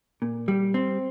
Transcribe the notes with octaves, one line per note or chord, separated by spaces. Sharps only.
A#2
G3
C4